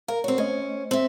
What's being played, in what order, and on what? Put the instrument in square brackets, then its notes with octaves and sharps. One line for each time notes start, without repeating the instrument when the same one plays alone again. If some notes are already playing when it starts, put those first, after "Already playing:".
[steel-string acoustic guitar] A#4 [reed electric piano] F5
[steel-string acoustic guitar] C4 F#4 [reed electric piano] C#5
[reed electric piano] A3 C5 D#5 [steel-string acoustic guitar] C#4
[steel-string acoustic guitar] C4 E5